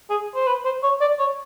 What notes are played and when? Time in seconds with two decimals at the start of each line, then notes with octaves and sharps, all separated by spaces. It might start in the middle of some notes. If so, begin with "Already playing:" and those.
0.10 G#4
0.35 C5
0.47 B4
0.65 C5
0.83 C#5
1.01 D5
1.19 C#5